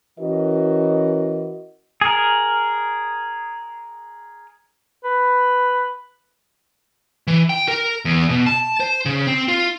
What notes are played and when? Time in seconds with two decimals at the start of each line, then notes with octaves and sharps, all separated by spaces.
0.20 E3 C#4 F#4 A#4 D#5
2.01 G#4 A#4
5.04 B4
7.27 E3
7.49 G5
7.68 A#4
8.05 E2
8.29 B2
8.46 A5
8.80 C5
9.06 C#3
9.27 C4
9.48 F4